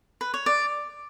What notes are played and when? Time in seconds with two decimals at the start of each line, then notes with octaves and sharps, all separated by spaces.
0.21 B4
0.34 C#5
0.46 D5